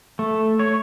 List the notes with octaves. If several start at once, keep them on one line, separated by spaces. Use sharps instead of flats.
A3
C#5